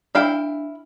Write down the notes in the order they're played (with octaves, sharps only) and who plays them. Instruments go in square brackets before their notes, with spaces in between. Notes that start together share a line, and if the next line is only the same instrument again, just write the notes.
[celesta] D4 [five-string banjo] E4 F5 G5